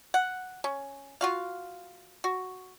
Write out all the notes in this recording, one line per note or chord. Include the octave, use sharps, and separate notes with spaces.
F#5
C#4
F4 F#4 F5
F#4